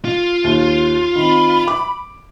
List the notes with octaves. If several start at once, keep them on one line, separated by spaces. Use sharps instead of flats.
F4
D#2
D#3 C4 B5
D6